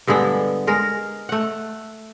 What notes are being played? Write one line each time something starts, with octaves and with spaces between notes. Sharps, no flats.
G2 D3 G#3 B3
G#3 A#4
A3 F#5